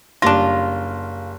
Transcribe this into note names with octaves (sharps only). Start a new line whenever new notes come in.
F#1 G3 D4 F4 A#6